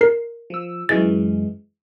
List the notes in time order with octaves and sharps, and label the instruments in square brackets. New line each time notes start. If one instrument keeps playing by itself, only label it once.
[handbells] A#4 C7
[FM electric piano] F3 E6
[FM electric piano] F#2 E3 G#3 [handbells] A6